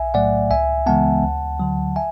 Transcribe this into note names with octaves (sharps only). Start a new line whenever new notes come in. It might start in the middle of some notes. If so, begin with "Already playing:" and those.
Already playing: B1 E5 G#5
A2 F#3 A3 D5 F#5
C#2 E5 G#5
C#3 E3 G#3 B3 F#5 A5
D2
D3 F#3
E5 G#5